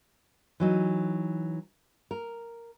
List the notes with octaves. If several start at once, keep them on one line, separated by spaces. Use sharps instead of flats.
E3 F#3 D#4
A#4